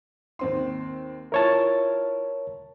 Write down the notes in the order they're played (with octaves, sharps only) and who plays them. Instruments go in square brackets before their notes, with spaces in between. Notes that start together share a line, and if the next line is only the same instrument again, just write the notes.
[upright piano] D#2 C4 C6
[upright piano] E4 F4 [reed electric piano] A#4 C#5 A5